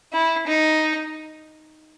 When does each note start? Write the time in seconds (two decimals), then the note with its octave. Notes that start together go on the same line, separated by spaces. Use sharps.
0.13 E4
0.47 D#4